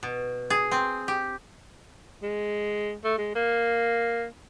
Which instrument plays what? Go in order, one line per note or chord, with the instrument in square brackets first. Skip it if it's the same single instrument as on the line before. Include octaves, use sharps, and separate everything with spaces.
[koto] B2
G#4
C4
G4
[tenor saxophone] G#3
A3
G#3
A#3